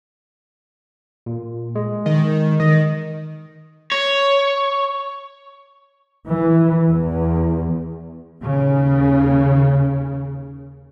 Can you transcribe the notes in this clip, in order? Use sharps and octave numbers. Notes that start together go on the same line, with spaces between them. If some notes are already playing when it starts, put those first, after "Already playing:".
A#2
G#3
D#3
D#3 D#5
C#5
E3
E2
D#2 C#3